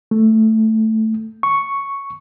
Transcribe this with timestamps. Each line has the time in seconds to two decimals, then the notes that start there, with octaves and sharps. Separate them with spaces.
0.11 A3
1.43 C#6